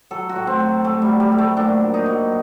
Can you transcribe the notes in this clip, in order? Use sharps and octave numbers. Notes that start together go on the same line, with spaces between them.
F#3 A4
F#4
A2
C4
F#3
A2 A3
G3
F#3
G3
A2
A3
A#2 D4
F#3
D#4
F#3